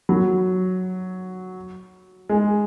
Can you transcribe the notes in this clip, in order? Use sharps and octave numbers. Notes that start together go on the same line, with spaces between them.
F#3
G#3